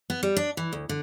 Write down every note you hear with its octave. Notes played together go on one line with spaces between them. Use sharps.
B3
G3
D4
E3
D2
D3